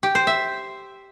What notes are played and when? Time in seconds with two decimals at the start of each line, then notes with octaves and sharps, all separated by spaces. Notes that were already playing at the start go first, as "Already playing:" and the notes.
0.03 G4
0.15 C5
0.27 E5